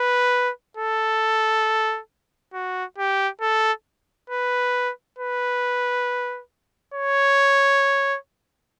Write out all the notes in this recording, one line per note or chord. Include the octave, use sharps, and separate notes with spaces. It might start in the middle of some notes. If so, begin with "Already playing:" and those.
Already playing: B4
A4
F#4
G4
A4
B4
B4
C#5